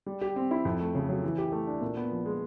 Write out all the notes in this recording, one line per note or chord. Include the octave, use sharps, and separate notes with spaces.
G3
G4
C4
E4
F2
A3
C#3
F#3
E3
G4
A3
D4
A#2
B3
F3
G#3